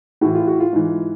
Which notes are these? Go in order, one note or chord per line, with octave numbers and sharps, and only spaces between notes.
A2 E3 F#4
F4
F#4
F4
G#2 E3